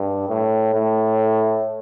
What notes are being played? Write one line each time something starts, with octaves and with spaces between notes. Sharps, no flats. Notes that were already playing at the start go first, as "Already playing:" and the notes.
Already playing: G2
A2
A2